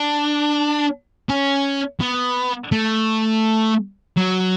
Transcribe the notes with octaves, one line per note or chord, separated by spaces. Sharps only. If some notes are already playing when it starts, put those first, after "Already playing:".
Already playing: D4
C#4
B3
A3
F#3